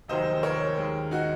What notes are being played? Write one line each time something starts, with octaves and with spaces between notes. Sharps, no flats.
F1 D#2 D#3 F#3 C5 D#5
A#4 C#5
D#2 D#3 G#3
D#4 F#4